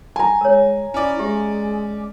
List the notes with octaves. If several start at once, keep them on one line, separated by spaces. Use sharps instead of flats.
G#5 A#5
G#3 A#4 C#5
C#4 E4 D5
G#3 G4 E5